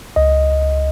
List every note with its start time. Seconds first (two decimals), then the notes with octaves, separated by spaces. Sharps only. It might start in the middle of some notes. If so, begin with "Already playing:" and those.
0.16 C#2 D#5